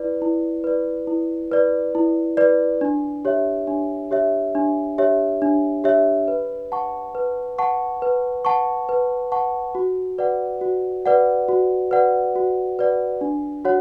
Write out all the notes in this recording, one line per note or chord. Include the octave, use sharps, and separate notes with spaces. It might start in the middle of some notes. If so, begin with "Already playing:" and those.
Already playing: E4 B4 D5
E4
B4 D5
E4
B4 D5
E4
B4 D5
D4
G4 C#5 E5
D4
G4 C#5 E5
D4
G4 C#5 E5
D4
G4 C#5 E5
B4
F#5 A5 C#6
B4
F#5 A5 C#6
B4
F#5 A5 C#6
B4
F#5 A5 C#6
F#4
B4 D5 F#5
F#4
B4 D5 F#5
F#4
B4 D5 F#5
F#4
B4 D5 F#5
D4
F#4 C#5 F#5